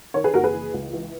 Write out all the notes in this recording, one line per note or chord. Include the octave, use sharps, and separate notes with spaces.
D#3 A#4 C#5
G#4 B4
F#1 F#4 A#4
G#4 B4
E3
C#2
E3